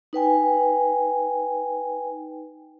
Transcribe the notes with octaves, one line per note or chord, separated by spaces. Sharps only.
D#4 B4 G5 G#5